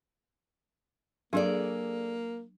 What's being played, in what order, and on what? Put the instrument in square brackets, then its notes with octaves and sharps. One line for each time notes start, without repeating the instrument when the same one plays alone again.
[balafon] F#3 D4 [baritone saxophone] A#3 [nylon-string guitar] G#4 A4 D5